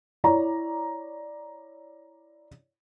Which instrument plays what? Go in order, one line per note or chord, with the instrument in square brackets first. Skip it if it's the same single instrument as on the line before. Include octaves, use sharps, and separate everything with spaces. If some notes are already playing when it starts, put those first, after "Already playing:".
[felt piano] E4 C#5 D5 A#5